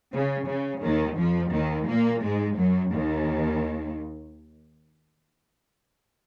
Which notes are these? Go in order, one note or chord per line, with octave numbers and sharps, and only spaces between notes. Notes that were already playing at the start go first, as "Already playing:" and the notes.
C#3
C#3
D#2 D#3
F2 F3
D#2 D#3
A#2 A#3
G#2 G#3
F#2 F#3
D#2 D#3